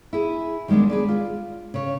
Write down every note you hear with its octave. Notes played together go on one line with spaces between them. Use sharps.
E4 G#4
D#3 G3 G#3 B3 D4
G#4 B4 D5
F4
C#3 C#5